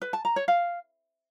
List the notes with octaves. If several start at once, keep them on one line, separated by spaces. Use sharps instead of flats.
B4
A5
A#5
C#5
F5